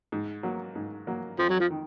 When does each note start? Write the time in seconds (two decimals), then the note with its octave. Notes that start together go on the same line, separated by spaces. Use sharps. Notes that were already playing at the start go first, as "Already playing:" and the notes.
0.12 G#2
0.43 F#3 A#3
0.75 G#2
1.07 F#3 A#3
1.38 F2 F3
1.49 F#3
1.60 F3
1.70 D#3